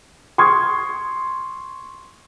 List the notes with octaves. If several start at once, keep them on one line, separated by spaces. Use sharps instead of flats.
C6 C#6 D#6 F6 G#6